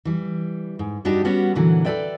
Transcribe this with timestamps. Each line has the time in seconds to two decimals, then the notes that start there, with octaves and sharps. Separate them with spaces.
0.05 E3 G3
0.79 G#2
1.05 G2 G3 D4 D#4 F#4 G4
1.25 G3 B3 C#4 F#4
1.55 A#2 D3 E3 F#3
1.85 A4 B4 D5 E5 G5